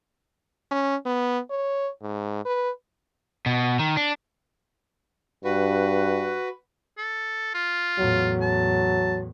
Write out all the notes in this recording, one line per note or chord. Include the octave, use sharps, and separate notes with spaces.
C#4
B3
C#5
G#2
B4
B2
D#3
D4
G2 F#4 B4
A4
F4
E2 A2 F#3
A5